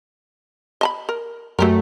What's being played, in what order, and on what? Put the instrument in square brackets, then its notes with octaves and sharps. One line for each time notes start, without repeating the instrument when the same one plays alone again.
[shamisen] D#5 A5 B5
A#4
[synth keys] F#2 A3 [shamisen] F#3 G4 A#4